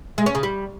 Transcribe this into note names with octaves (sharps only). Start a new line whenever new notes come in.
G#3
C#4
C#3
G3